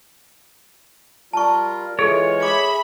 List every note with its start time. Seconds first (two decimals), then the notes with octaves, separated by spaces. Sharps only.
1.33 G3 F4 A#4 A5 C#6
1.99 E3 G#3 F4 G#4 A4 C#5
2.42 G#4 E5 B5 D6